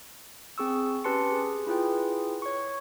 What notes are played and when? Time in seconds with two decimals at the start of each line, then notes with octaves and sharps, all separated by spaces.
0.58 C4 G#4 C#6 E6
1.04 C#4 G4 B4 A5 C6 C#7
1.32 G#4
1.67 E4 F4 G#4 B4 G5
2.42 C#5 C#6